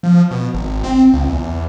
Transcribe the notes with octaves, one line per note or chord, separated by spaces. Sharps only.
F3
B2
G#1
C4
C#2
E2